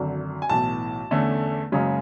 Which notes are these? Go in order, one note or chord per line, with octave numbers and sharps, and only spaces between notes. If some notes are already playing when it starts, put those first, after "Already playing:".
Already playing: G#1 F#2 D3
G#5
B1 A2 E3 A5
E2 D3 A3 C#4
F#1 F#2 C#3 G#3 C#4